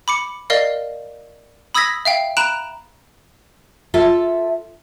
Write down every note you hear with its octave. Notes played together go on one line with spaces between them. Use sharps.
B5 D6 C#7
A#4 D5 D#5 F5
B5 D#6 E6 G#6 A#6 B6
E5 F5 G5
A#5 B5 F#6 D7 E7
F4 A4 E5